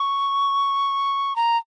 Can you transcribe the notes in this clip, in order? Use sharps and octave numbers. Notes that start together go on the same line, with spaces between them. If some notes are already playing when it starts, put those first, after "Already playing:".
Already playing: C#6
A#5